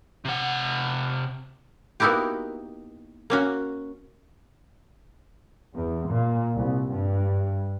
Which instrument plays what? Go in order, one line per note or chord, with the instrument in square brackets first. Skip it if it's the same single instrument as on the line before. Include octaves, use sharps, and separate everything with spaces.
[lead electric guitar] C3 F#5
[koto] A#3 B3 D#4 E4 F#4 G4
A#3 C#4 F#4
[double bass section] E2
A#2
C2
G2